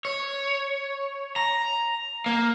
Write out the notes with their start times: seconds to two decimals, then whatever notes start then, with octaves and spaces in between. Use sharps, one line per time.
0.05 C#5
1.36 A#5
2.26 A#3